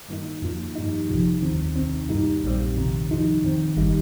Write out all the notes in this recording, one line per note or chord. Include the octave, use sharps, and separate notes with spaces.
G2 D#3 A#3 D#4
F2 F3 A#3
G2 G3 D#4
G1 F2 C3 F3
D#2 D#3 C4
C2 C3 D#3 C4
G2 G3 A#3 D#4
A#1 A#2 G3 C4
F2 C3 D#3
F2 F3 D#4
F2 D#3 C4
G1 G2 D#3 G3 D#4